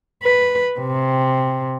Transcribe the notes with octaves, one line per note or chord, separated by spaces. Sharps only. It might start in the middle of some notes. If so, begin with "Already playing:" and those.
B4
C3